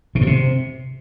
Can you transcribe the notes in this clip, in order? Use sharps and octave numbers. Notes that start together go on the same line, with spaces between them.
B2
G2
C3